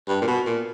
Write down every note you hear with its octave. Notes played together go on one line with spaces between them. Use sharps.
G2
A#2
B2
A#2